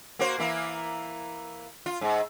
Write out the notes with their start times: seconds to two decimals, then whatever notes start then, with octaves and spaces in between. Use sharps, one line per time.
0.19 A#3 F#4 C5
0.38 E3 A#3 E4
1.86 F4
2.01 G#2